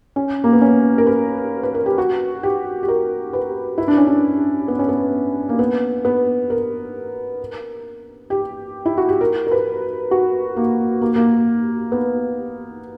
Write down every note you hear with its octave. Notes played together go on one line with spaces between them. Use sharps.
C#4
A#3
B3
C#4
A#4
B4
B4
A#4
G4
F#4
G4
G4
A#4
B4
E4
D4
C#4
D4
B3
C#4
B3
A#3
B3
B3
A#4
G4
E4
F#4
G4
A#4
A#4
B4
F#4
A#3
A#3
A#3
B3